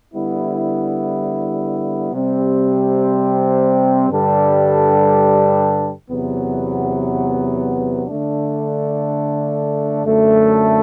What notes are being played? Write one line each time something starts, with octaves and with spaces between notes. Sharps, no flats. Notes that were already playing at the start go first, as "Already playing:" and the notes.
D3 G3 B3 E4
C3 G3 C4
G2 D3 G3 D4 A4
E2 C3 F#3 B3
D3 A3 D4
F#2 D3 A3